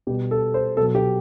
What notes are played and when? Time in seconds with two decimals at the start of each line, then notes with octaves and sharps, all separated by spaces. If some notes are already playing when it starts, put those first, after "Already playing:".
0.07 B2 G3 G4
0.31 A4
0.54 C5
0.77 B2 F#3 A4
0.95 G4